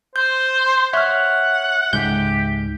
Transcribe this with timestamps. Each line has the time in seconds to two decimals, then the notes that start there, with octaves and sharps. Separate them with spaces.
0.16 C5 G6
0.93 C#5 E5 F#5 F6
1.93 C#2 G#2 G4 G6